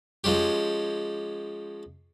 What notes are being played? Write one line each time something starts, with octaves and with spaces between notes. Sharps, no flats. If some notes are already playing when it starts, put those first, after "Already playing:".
F3 G#3 C#4 G4